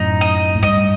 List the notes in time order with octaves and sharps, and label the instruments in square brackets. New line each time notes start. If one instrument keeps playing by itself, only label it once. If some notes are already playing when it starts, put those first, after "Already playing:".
Already playing: [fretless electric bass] F#2 A2 [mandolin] D#4
[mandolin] D#5
[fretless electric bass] A2
[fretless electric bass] G2 [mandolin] D#5